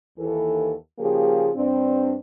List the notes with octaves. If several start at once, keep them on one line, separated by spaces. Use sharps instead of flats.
D#2 E3 A4
C#3 F3 A#3 G4 G#4
G2 C4 D4